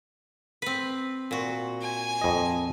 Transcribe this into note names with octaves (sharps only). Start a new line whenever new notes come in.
C4 B4
A#2 F#4
G#5
F2 D#5